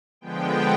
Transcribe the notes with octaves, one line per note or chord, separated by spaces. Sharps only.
D3 F3 G#3 B3 G5